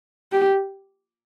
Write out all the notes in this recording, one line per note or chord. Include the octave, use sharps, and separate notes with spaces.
G4